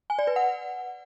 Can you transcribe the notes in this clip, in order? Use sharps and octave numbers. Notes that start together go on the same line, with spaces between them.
G#5
D5
B4
F#5